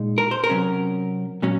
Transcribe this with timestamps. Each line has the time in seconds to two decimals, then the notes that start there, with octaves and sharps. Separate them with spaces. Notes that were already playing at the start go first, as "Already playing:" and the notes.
Already playing: A#2 G#3 D#4
0.18 A#4
0.31 C5
0.44 A#4
0.50 C3 F#3 C#4
1.42 A#2 F#3 C#4